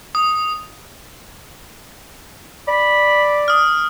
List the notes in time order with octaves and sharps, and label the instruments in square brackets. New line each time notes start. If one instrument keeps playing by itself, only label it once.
[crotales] D#6
[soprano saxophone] D5 [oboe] B5
[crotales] D#6 F6